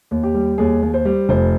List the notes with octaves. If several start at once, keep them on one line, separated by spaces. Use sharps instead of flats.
D#2
G4
G3
D#2 G#4
D#2
C5
G3
F1 C5